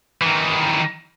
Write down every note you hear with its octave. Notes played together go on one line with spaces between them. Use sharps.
D#3 E3